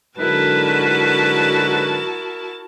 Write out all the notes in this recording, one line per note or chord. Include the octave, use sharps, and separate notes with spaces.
G#2 D3 F#3 E4 F#4 A#4 B4 A5